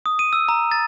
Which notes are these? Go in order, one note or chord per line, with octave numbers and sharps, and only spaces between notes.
D#6
D#7
E6
A#5
A6